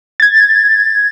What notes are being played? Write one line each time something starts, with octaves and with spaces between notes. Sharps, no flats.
G#6 A6